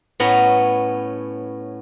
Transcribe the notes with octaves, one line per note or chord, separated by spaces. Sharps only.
A2 B3 C#4 A#5